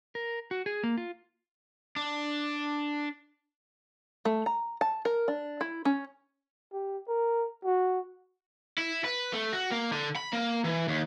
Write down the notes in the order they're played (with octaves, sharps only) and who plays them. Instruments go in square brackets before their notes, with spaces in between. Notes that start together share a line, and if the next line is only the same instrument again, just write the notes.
[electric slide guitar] A#4
F#4
G#4
A#3
F4
[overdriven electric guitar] D4
[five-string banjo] A3
A#5
A5
A#4
D4
E4
C#4
[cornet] G4
A#4
F#4
[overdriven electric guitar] E4
B4
A3
F#4
A#3
D3
B5
A#3
E3
D#2